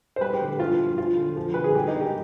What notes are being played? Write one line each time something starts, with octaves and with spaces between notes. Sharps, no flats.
C5
G3 B4
G4
D3
G2 F4
F3
F3 F4
D3
F3
D3 B4
G#4
G3 G4
D#4
D#3
G4